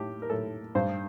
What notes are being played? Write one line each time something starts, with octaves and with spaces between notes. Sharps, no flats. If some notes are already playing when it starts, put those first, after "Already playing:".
Already playing: A2 G4
A#4
A2 A4
G2 C5